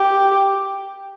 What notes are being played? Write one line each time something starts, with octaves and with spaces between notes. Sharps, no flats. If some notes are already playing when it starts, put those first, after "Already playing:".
Already playing: G4